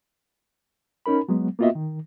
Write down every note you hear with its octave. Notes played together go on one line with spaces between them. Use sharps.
C#4 D#4 A#4 B5
F#3 G#3 B3
A#3 B3 F4 F#4 D#5 E5
D#3